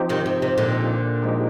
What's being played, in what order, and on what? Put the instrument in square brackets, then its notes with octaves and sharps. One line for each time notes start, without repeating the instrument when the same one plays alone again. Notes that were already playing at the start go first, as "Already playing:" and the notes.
Already playing: [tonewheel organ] F3 C4 D#4 G4
[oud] C3 D#3
C3
C3
A#2 D3
[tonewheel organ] F3 G#3 D#4 G4